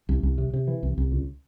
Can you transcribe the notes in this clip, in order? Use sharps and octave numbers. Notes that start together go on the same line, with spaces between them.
C2
C2
C3
C3
E3
C2
C2
C#2